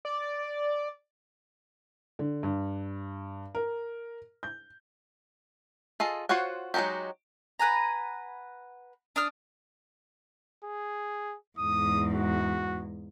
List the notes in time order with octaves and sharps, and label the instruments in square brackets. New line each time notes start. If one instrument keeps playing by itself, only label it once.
[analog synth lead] D5
[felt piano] D3
G2
A#4
G6
[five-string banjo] F4 G#4 A4 D#5
F4 F#4 C5 C#5 F#5
F#3 G#3 D#4 F#4 G4
[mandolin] B4 F#5 G#5 A#5
D4 D#6 F6
[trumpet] G#4
[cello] E2 G#2 [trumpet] D#6
[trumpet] F#4